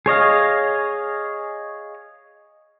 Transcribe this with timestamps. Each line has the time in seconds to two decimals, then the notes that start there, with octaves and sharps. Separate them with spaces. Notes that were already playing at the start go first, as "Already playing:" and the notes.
0.06 G#4 C#5 D#5 F5